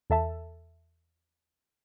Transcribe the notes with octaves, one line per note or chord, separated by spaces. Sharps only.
E2 A4 E5 A5